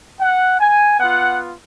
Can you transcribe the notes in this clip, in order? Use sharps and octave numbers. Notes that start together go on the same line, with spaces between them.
F#5
G#5
B3 F4 F#5